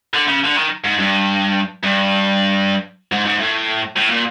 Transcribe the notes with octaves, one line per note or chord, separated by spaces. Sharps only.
D3
C#3
D3
D#3
G#2
G2
G2
G#2
G#2
A2
A2
A#2